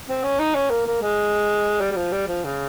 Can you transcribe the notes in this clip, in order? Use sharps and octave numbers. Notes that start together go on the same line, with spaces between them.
C4
C#4
D#4
C#4
A#3
A#3
G#3
G3
G3
F3
G3
F3
C#3